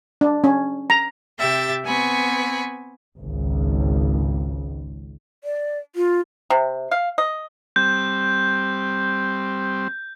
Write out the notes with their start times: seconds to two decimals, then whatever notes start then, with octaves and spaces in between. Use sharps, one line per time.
0.21 D4
0.44 C#4
0.90 A#5
1.39 C3 G4 E5 G5 A6
1.84 B3 C4 G#5 B5 C#6
3.17 G#1 C#2
5.44 D5
5.96 F4
6.50 C3
6.91 F5
7.18 D#5
7.76 G3 C4 G6